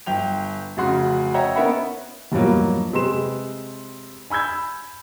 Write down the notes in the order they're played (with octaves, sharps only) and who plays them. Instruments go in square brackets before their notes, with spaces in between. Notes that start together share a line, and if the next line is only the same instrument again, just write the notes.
[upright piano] G1 G5 F7
F1 C#3 F#4 C6
C#5 D#5 E5 F#5 G5 A#5
B3 C#4 A#4 E5 F#5 B5
[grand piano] E2 G2 B2 F3 F#3 A#3
C3 G#3 B4 C6 E7
G#5 B5 E6 G6 G#6